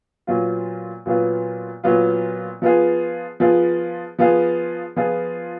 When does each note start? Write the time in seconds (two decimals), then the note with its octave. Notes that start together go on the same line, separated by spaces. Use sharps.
0.27 A#2 F#3 B3 F4
1.06 A#2 F#3 B3 F4
1.84 A#2 F#3 B3 F4
2.62 F3 B3 F4 G#4
3.40 F3 B3 F4 G#4
4.19 F3 B3 F4 G#4
4.96 F3 B3 F4 G#4